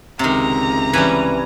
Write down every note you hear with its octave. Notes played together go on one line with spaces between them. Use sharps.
C#2 C3 D#3 A#5
E3 G3 C#4 B4